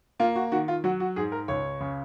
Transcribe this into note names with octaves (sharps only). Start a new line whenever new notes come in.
A#3 F4
F#4
D#3 F#4
F4
F#3 F#4
F#4
G#2 G#4
A#4
C#2 C#5
C#3